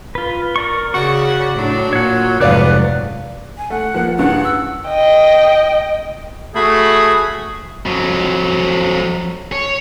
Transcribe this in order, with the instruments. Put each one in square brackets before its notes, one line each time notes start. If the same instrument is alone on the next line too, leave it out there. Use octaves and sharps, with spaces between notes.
[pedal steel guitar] F4 B4
A#4 D5 C#6
[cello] C#3 [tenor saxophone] F#4 [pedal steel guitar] D5 C#6
[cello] A2 D4 [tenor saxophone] F#3
[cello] A#2 [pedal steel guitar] C#5 F#5
[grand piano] F1 D5 F5 [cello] G#2 F#3 [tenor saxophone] B3 [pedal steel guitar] D6 F#6
[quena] G#5
[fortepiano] A3 [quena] F#5
[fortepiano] F3 A#3
[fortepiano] G2 C#3 E3 [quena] F#5
[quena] E6
[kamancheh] D#5 G5
[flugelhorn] A3 [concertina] F#4 B5 [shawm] G#4
[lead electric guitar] F2 F#3
C#5